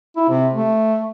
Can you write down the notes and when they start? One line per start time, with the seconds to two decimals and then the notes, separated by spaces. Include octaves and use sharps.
0.17 E4
0.29 C3
0.53 A3